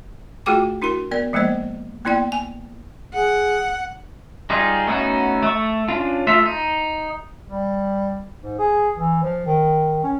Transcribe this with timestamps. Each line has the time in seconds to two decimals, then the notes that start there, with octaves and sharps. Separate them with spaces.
0.46 A3 F4 F#4 G#4 G5 D6
0.82 D4 E4 F#4 A#4 C6
1.11 B3 A#4 D5
1.33 F3 G#3 A#3 B3 C5 D#5
2.05 A#3 B3 E4 D5 G5
2.32 G#5
3.14 G#4 F#5
4.50 G3 D#4 F4 G#4
4.87 A3 B3 C#4 D#4 F#4
5.43 A3 C#6
5.88 C#4 D4 F4
6.27 A3 F4 E5
6.46 D#4
7.50 G3
8.42 G#2
8.59 G#4
8.95 E3
9.23 F3
9.46 D#3
10.03 C#4